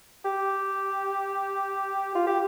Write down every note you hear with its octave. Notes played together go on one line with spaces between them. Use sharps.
G4
F4
G4